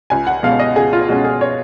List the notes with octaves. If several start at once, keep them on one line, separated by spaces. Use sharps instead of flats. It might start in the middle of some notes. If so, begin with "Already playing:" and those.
C#2 G#5
F#5
B2 G#3 C#4 F5
D#5
C#2 G#4
F4
B2 G#3 C#4 F#4
G#4
C#5